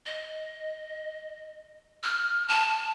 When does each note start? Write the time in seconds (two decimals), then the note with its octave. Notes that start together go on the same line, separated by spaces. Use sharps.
0.06 D#5
2.03 F6
2.48 A5